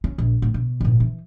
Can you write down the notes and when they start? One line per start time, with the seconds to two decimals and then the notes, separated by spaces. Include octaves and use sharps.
0.04 C#4
0.18 A#1
0.42 A2
0.54 B2
0.81 G#1 A#2
1.00 E3